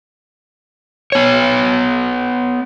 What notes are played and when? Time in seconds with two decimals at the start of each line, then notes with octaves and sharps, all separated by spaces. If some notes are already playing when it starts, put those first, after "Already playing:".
1.12 B3 C#5